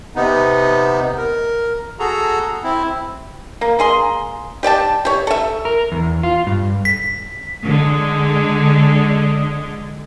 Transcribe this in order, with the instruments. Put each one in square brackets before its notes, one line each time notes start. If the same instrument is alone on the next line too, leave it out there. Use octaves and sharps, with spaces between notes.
[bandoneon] C3 B3 D#4
A#4
F#4 G#4 A4 A#5
C4 E4
[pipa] A#3
A#3 G#4 C6
G4 D5 G5 A5
G4 C#5
A4 E5
[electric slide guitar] A#4
E2
F4
G2
[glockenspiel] B6
[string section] D3 G#3